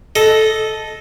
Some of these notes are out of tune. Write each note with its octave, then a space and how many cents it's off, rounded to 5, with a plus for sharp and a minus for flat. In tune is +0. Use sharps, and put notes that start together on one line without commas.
A4 -10 D#5 +0